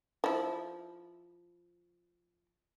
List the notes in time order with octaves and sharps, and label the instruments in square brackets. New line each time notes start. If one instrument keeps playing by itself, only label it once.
[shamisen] F3 E4